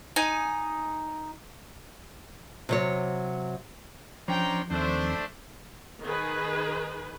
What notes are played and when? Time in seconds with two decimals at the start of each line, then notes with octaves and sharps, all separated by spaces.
0.16 D#4 G#5
2.69 C3 F#3 C#5
4.28 F3 C#4 D4 C5 G5 A#5
4.70 D#2 A3 C4 D4 C5
6.03 D#3 G#4 B4